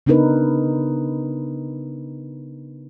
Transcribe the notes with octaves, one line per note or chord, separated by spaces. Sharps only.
C#3 B3 D4 D#4 A#4 B4